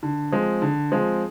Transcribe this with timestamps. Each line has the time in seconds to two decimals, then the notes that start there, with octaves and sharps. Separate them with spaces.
0.03 D3
0.32 F3 G#3 C4
0.62 D3
0.92 F3 G#3 C4